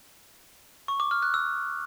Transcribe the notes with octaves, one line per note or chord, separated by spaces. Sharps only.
C#6
D6
F6
F#6
E6